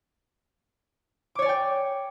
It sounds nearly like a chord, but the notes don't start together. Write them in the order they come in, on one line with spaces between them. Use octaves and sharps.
D6 C#5 D5 G#5 G5